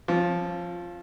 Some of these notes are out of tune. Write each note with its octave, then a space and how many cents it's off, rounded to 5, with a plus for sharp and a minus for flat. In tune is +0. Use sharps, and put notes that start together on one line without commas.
F3 +0 C4 +45